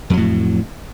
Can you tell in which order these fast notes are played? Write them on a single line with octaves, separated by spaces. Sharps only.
F2 F#3 A2